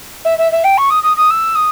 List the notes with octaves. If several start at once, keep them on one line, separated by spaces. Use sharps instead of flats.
E5
E5
E5
G5
C#6
D#6
D#6
D#6
E6
D#6